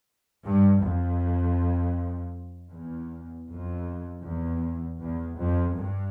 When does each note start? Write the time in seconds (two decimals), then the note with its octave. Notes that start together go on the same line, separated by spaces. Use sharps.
0.43 G2
0.81 F2
2.72 E2
3.49 F2
4.24 E2
5.00 E2
5.39 F2
5.77 G2